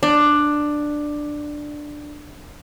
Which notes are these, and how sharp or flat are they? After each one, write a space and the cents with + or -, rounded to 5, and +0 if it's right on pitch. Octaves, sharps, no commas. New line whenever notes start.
D4 +10